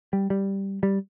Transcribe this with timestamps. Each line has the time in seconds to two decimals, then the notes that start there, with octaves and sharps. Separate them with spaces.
0.13 G3
0.30 G3
0.83 G3